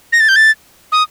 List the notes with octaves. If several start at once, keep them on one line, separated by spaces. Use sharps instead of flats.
A#6
A6
G6
A6
D#6